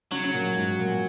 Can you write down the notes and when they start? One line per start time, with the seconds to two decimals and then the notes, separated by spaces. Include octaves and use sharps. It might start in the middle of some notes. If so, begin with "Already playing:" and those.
0.11 C#3 F#3
0.24 C#3
0.34 A#2
0.56 G#2
0.79 A#2